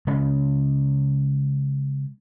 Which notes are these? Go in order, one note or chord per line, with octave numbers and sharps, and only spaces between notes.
C#3 G#3 C#4